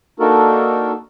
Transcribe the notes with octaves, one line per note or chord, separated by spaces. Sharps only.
A#3 D4 D#4 F#4 A4 A#4